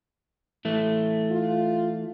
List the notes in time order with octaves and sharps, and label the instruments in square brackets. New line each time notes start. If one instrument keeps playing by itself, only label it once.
[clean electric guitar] E3 A3
[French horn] F4